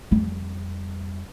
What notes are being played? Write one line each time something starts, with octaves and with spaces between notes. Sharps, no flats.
F2 G3